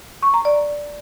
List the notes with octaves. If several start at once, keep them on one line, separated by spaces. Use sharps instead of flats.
C#6
A#5
D5